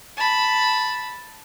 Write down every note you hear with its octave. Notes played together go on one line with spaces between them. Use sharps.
A5 B5